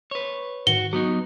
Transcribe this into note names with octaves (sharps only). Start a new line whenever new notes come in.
B4 C#5
G#2 D#3 F#4 G7
F#3 B3 D#4 F#4